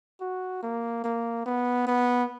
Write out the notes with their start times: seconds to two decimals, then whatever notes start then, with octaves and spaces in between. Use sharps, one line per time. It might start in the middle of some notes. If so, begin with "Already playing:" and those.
0.21 F#4
0.63 A#3
1.04 A#3
1.46 B3
1.87 B3